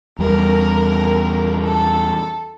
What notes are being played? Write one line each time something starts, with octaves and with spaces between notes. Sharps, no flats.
E2 G3 A#4
A4